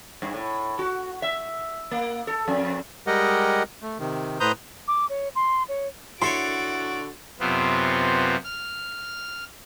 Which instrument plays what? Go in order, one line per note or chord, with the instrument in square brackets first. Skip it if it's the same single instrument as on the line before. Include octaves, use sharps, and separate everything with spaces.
[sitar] G2
A2
F#4
E5
A#3
A4
F2
[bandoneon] G3 G#3 G4 A#4 D#5 F#5
A3
C3 D#3
A2 B4 C5 A#5 D#6 G6
[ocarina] D6
C#5
C6
C#5
[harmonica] D3 F#4 [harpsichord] E4 A4 C#5 [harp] C6 [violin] A6 D7
[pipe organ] F#2 C3 B3 C4 F4
F6